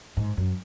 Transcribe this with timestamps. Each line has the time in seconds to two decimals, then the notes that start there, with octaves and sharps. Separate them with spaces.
0.17 G#2
0.37 F#2